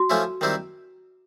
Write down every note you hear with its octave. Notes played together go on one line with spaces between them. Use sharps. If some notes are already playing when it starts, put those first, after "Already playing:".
Already playing: F#4
F3 A3 C#4 E4
D#3 G3 C4 E4